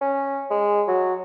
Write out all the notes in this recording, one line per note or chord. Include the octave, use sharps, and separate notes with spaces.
C#4
G#3
F#3